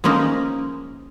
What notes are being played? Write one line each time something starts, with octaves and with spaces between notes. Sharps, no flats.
F3 G#3 A#3 C#4 D#4